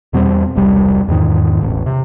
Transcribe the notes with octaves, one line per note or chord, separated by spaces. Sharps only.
E2 B2 G3 C4
E1 C2 G3
E2 G#2 D#3
E1 A1
C3